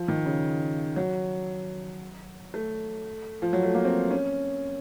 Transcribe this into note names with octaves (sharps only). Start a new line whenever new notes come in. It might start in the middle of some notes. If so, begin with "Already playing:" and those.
Already playing: F3
D#3
C#3
F#3
A3
F3
F#3
A3
A#3
C4
C#4